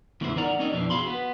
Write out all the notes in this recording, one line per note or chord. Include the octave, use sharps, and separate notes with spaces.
E2 A2 C#3 E3 E4 C5
D#4 A#4 D5 F#5 A#5
C4 C#4 D#4 A#4 D5 D#5
F2 B2 E3 B3 C4 D4
F#4 G#4 F5 B5 C6
B3 B4